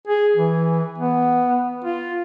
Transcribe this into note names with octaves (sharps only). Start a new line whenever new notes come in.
G#4
E3
B3
F4